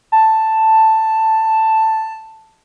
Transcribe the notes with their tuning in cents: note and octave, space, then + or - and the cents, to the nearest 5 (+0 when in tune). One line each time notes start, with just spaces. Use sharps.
A5 +5